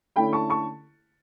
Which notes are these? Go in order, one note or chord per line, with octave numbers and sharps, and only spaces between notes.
D3 A3 C#4 E4 G5 B5
A5 C#6
A5 C#6